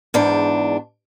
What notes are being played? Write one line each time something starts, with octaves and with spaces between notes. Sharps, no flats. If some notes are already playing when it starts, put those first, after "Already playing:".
E2 G#2 D4